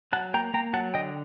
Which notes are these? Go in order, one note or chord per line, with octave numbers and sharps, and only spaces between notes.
F#3 F#5 A5
A#3 G5 A#5
A#3 G5 A#5
F#3 F#5 A5
D3 D#5 G5